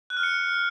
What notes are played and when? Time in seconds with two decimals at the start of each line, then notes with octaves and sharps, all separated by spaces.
0.10 F#6
0.17 F6
0.23 C#7